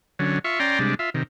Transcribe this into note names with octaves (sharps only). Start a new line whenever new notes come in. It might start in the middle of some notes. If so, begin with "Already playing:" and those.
D3 F#3 C#4
F4 E5 C#6
C#4 D5 G5 A#5 C6
C3 G3 G#3 D4
F4 E5
C3 D#3